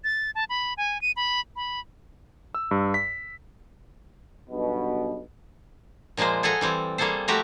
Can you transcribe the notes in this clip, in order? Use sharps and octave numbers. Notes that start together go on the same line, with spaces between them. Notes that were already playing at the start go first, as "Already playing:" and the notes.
A6
A5
B5
G#5
D#7
B5
B5
E6
G2
B6
B1 G2 B2
A#2 F3 G#3 A#3 C5
G#4 A4 F#5 G#5 A#5
E3 G3 C4
G3 A#3 G#4 A4 C5
F3 A3 F#4 G4 E5 A#5